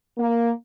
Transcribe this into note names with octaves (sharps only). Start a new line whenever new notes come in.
A#3